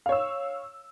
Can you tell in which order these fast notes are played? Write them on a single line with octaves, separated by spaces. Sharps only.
F5 C#5 E6